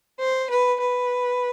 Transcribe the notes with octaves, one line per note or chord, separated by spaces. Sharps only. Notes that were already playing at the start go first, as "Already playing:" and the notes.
C5
B4
B4